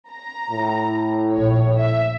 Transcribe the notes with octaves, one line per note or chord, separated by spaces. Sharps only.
A#5
A2
A#1 C#5
E5